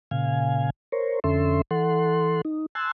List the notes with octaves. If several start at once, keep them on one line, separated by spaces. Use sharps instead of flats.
A#2 C#3 F5 G#5
A#4 C5 C#5
F2 D3 C#4 A4 E5 C6
E3 A4 F#5 C6
D#4
G#5 A5 C6 E6 F#6